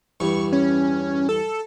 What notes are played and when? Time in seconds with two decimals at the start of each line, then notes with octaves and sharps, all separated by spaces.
0.20 E2 G2 C#6
0.53 C#4
1.29 A4